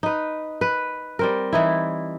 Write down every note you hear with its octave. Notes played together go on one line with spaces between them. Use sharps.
D#4 B4
B4
G3 C4 A#4
E3 D#4 E4